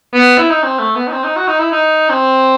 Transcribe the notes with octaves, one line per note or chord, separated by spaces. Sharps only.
B3
E4
D#4
C4
A3
B3
D#4
C4
D#4
F#4
D#4
E4
D#4
C4